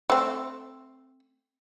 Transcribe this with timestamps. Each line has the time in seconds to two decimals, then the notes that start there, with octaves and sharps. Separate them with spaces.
0.10 A3 C4